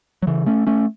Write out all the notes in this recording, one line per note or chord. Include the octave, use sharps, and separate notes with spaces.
F#3
C#3 E3
A3 C#4
A3 C#4